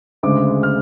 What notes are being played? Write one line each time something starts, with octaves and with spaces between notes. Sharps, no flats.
D2 C#3 G#3 D6
F6